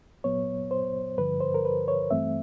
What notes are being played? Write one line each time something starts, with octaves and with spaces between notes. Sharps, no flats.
A#2 F#3 B3 C#5
C5
G2 D3 F3 B4
C5
A#4
B4
C#5
G2 E3 A3 C4 E5